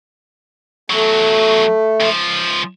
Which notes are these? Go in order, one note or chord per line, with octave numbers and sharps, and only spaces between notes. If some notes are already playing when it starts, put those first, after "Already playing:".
E2 F#3 A3
C#2 F3